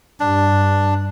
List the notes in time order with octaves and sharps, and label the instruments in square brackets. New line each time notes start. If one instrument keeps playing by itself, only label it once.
[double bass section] G2 [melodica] D4